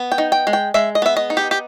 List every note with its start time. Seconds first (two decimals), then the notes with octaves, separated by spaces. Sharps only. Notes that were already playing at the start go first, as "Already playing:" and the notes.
Already playing: B3
0.12 G5
0.18 D#4
0.32 G5
0.47 G#3
0.53 G5
0.74 G#3 E5
0.95 D#5
1.02 B3 E5
1.17 D#5
1.30 D#4
1.37 G4
1.51 G4